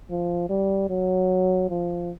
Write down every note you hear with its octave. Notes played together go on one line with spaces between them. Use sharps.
F3
G3
F#3
F3